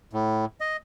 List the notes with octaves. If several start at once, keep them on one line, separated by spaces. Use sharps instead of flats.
A2
D#5